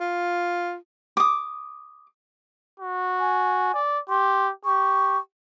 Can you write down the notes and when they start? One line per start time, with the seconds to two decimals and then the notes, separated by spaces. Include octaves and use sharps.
0.01 F4
1.17 D6 D#6
2.80 F#4
3.20 G#5
3.74 D5
4.09 G4 C6
4.65 G4 C#6